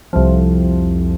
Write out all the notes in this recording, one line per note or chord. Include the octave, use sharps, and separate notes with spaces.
C2 F2